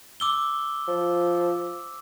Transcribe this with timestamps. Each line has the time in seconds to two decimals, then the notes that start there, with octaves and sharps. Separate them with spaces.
0.20 D6 E6 G7
0.88 F3